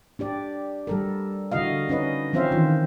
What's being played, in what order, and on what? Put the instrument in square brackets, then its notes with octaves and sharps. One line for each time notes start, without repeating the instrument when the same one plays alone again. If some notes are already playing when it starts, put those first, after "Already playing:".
[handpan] D4 G4 D5
G3 A4 A#4
D3 E4 F#4 D#5 F5
C#4 D#4 B4 D#5
F3 C4 C#4 C5 E5 F5
D#3 E3 F4